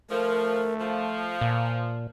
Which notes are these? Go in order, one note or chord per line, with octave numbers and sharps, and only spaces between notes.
F3 A3 A#4
F3 F5
A#2